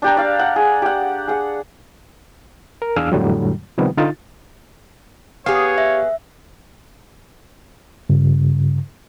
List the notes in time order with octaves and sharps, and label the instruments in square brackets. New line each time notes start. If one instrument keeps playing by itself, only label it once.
[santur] D4 G4 A#5
D5 F5
F#5
G#4
G4 F#5
G#4 F#5
[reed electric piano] A#4
E2 D4 G#4 F5 E6 F6
F2 A2 D3 F#3 G3
C3 D#3 F3 G3 B3
D3 D#4 F4 A6
[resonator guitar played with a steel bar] B3 G#4 [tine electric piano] G4 F5 [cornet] C#5
[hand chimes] E5
[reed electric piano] G2 C#3